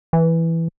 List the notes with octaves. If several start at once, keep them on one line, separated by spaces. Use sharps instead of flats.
E3